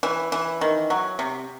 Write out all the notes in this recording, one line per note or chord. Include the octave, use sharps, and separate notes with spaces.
E3
E3
D#3
F#3
C3